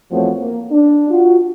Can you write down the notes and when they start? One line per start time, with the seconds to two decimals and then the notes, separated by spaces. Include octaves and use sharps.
0.11 E2 F3 A3 C4 F#4 C#5
0.40 A#3
0.71 D4
1.10 F4 F#4